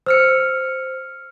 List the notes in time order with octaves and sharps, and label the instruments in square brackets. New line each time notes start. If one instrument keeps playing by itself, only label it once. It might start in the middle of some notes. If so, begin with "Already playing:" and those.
[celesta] C5 [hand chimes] E6 F6 C#7